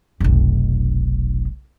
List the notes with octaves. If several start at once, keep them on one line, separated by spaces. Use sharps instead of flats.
F1 B1